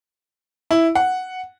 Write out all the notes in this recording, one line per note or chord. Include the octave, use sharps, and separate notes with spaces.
E4
F#5